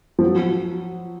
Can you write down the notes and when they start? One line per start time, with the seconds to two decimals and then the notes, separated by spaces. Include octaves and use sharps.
0.19 F3
0.24 F#3